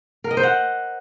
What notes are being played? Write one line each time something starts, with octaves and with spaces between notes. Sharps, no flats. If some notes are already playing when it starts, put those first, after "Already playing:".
A#4
D#5
C5
F#5